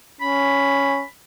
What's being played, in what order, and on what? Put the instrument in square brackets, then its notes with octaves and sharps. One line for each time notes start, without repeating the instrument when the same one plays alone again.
[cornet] C#4 [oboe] B5